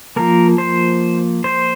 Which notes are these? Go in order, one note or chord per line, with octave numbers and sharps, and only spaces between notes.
F3 A#3 A#4
C5
C5